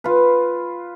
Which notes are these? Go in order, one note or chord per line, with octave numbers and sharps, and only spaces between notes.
F4 B4